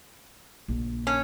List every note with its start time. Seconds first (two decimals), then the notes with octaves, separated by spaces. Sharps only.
0.68 A#1 C#3
1.07 C#4